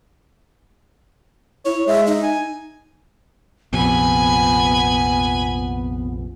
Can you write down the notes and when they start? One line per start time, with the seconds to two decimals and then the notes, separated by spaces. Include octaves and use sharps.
1.65 E4 C#5
1.87 G#3 E5
2.07 D#4
2.23 G#5
3.73 A#1 F2 C3 B3 G#5 B5